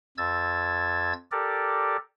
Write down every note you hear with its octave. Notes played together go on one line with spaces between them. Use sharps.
F2 E6 G#6 A6
G4 A4 A#4 D5